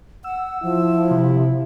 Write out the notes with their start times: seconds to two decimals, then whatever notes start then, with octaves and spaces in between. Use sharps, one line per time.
0.24 F#5 E6
0.63 F3 E4
1.11 C3